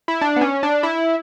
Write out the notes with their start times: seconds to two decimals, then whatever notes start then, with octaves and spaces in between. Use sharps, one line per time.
0.08 E4
0.21 D4
0.36 B3
0.41 C#4
0.63 D4
0.83 E4